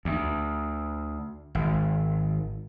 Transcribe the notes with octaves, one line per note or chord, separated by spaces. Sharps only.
D2
G#1